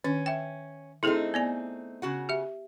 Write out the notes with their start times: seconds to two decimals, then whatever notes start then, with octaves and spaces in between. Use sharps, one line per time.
0.04 D#3 C#4
0.26 E5 G5
1.03 A3 C4 D#4 E4 G#4 A4
1.34 B3 D5 G#5
2.02 C#3 F#4 F#5
2.29 G4 E5